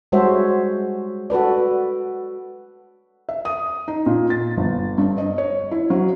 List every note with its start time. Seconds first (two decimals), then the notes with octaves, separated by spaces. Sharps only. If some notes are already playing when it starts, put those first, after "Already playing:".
0.12 G3 G#3 F#4 C5 C#5 E5
1.30 F#4 A4 B4 D5
3.29 E5
3.45 D#6
3.88 D#4
4.06 A#2
4.30 A6
4.57 G1
4.98 G2
5.18 D#5
5.38 C#5
5.71 E4
5.90 F#3